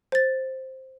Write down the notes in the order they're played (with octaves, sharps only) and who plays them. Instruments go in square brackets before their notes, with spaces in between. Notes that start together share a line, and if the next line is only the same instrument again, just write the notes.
[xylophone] C5 A6